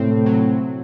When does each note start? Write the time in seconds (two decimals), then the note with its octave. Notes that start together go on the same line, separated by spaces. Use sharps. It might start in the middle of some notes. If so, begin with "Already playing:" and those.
Already playing: A2 C3 C4
0.26 F#3